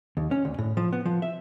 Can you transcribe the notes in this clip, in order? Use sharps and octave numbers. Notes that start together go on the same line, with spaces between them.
D#2
C#4
D2
A2
F3
B3
F3
E5